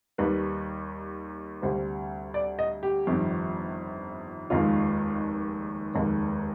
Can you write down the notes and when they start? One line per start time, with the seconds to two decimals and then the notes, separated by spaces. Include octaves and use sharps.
0.18 D#2 D#3 G3 B4
1.62 D2 C3 G3 C5
2.34 D5
2.59 D#5
2.83 G4
3.07 G1 F2 D#3 G3
4.50 F1 D#2 D#3 G#3 F4
5.95 F1 D#2 D#3 G#3